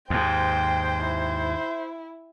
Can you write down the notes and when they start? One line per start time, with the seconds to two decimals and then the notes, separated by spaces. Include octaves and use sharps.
0.10 D#2 G#2 C5 G5
1.04 E4